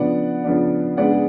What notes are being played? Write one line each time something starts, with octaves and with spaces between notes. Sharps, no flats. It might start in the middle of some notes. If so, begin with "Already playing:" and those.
Already playing: C#3 F3 B3 D4 D5 F#5
C#3 F3 B3 D4
C#3 G#3 B3 D4 D5 F#5
G#4